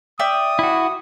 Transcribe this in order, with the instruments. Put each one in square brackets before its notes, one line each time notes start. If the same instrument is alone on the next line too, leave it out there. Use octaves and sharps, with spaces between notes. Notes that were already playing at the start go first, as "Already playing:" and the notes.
[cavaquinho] D5 E5 G5 [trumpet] D#6
[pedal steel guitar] E4 F#4